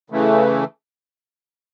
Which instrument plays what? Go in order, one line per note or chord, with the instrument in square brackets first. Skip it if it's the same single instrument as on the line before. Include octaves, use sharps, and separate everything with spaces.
[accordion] C#3 E3 A3